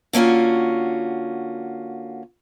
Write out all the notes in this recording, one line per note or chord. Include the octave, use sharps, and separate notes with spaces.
D3 A#3 C#4 F4 F#4